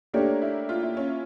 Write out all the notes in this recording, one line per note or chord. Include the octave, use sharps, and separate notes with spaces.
A3 A#3 D4 G4 C#5
E4
F4
E4
C#4